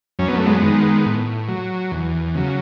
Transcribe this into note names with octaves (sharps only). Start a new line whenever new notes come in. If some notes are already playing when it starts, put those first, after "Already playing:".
F#2 C#4
B3
A3
G#3 B3
D#3 G#3
A2
F#3
E2
C#3 F#3